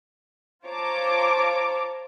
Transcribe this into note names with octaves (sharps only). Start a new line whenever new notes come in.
F4 C5 C#5 A5 A#5 D6